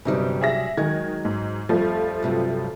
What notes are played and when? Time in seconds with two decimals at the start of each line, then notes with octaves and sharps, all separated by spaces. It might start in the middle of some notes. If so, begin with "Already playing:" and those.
0.05 G1 C3 F#3 G3 D#4 C5
0.41 G#4 E5 A#6
0.77 D#3 F#3 G#3 G#6
1.25 G#2
1.69 F2 F3 G3 A3
2.23 G2 C3 F#3